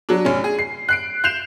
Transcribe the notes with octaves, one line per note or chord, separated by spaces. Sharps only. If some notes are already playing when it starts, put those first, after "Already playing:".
F#3 D4
F1 C#4
G#4
C7
F#6 C7 D7
F#6 G6 C7 E7 F7